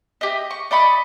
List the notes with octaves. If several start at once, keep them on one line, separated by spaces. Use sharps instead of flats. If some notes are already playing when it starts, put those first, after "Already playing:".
G4 D#5
C#6
D5 D#5 B5 C#6